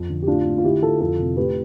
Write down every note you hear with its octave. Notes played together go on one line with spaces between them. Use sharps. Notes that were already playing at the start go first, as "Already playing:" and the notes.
Already playing: F2
D3
G4
A2 D4 F4
A2
F4
D3 E4 G4
D3 F4 A4
F2 F4 A4
C3
A2 G4 B4